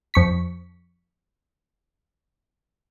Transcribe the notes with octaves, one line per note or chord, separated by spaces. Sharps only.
F2 C#6 B6